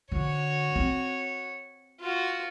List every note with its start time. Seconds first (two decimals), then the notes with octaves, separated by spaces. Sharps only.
0.12 D3 F#4 C#5
0.76 C4
2.00 F4 F#4